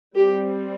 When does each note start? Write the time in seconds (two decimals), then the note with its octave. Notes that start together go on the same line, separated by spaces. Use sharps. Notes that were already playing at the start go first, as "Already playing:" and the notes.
0.15 G3 C4 G4